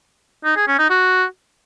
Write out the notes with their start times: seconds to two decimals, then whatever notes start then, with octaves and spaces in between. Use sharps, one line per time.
0.45 D#4
0.56 G#4
0.68 C#4
0.79 D#4
0.90 F#4